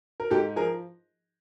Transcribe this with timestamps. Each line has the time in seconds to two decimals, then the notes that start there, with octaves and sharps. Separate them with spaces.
0.20 A#4
0.30 G#2 G4 A4
0.56 F3 G#4 A#4